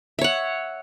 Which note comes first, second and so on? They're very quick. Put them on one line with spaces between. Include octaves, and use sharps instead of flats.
E5 C#5 F#5